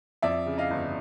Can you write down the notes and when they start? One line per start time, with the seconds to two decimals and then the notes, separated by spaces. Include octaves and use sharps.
0.22 F2 D5 E5
0.46 C#3
0.58 D#5 F5
0.70 G1